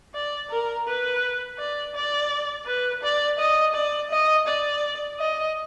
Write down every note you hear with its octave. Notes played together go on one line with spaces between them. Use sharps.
D5
A#4
B4
D5
D5
B4
D5
D#5
D5
D#5
D5
D#5